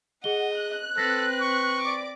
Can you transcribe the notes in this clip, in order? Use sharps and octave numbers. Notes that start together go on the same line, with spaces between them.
G#4 D#5 F#5 G7
F#6
C4 A4 B4 A#6 B6
C#6
D5 D6